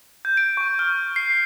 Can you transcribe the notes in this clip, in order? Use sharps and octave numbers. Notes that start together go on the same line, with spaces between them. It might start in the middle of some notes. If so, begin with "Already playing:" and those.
G6
D7
C#6
F6
C7